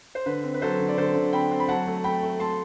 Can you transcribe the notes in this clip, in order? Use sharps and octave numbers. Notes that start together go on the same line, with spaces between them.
C5
D3 B4
C4
B4
F#3 A4 C5
D3
D5
D3 A4 C5
D3
C4 G5 B5
C4
B5
F#3 F#5 A5
A3
A3 G5 B5
A3
A3 A5 C6